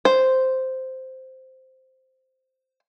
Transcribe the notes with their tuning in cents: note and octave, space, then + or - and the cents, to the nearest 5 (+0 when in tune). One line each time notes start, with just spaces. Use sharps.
C5 -5